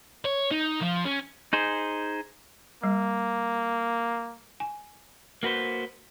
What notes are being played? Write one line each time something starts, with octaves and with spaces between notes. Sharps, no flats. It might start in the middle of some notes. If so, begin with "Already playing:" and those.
C#5
D#4
F3
C#4
D#4 G#4 C5
G3 A#3
G#5
A#3 F#4 B4 C5